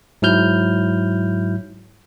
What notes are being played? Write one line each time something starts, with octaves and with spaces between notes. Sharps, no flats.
G#2 F#3 E4 F6 G6